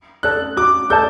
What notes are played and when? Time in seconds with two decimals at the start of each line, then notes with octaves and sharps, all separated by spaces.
0.23 A4 D5 A5 F#6
0.57 F#4 D6
0.90 A4 D5 A5 G6